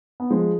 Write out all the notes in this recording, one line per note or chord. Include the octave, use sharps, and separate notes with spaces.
B3
F3 G#3